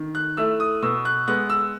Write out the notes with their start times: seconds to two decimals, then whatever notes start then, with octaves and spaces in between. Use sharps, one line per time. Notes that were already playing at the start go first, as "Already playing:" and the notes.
Already playing: D#3
0.15 F#6
0.37 A3 E4 E6
0.60 D#6
0.82 B2 E6
1.05 F#6
1.27 G#3 B3 F#6
1.50 E6